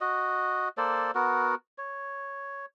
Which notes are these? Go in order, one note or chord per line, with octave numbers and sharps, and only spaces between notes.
F#4 D#5
A#3 A4 C5 D5
B3 F#4 A#4
C#5